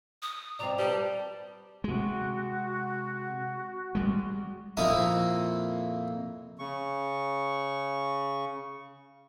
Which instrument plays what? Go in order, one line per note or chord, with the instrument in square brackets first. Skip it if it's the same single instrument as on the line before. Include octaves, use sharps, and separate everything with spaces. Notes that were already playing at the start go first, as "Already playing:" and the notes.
[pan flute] D#6
[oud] B2 F3 C4 [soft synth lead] D5 [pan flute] A#5
[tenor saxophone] G3 [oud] B4 [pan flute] A5
[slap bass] C3 G#3 [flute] F#4
[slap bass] G3 G#3
[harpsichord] F2 A#2 A#3 E4 A#4 D#6
[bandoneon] C#3 C#6